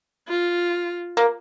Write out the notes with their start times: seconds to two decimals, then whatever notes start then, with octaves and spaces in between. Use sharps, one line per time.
0.28 F4
1.17 A#3